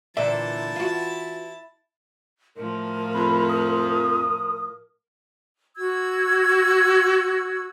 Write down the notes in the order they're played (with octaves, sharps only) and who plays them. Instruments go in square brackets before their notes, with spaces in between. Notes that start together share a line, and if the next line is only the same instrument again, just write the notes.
[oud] A#2 D3 [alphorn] E3 [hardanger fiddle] E4 A5 [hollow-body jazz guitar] D5 E5
[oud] F4 F#4
[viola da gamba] A2 F3 [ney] A#4
[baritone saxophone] F2 [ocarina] B5
[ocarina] D#6
[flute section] F#4 E6 G#6